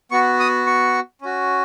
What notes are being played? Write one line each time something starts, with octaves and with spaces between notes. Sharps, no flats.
B3 F#4 C#6
D#6
C#6
C#4 F#4